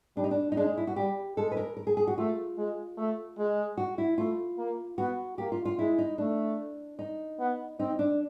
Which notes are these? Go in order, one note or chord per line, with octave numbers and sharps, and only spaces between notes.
G3 D4
D#4
D4
D#4
G#3 D4
D#4
E4
F#4
G3 G4
G#3 A4
B4
A#4
A#4
G#4
G#4
F#4
A3 F4
G#3
A3
G#3
F#4
E4
A3 F4
A#3
B3 F#4
A#3 G4
F4
F4
G#3 E4
D#4
A3 D4
D#4
B3
C4 D#4
D4